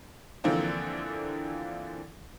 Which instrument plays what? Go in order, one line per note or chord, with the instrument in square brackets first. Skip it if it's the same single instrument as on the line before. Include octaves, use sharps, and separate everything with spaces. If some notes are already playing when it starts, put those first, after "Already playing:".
[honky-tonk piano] D3 E3 F3 A#3 C4 A4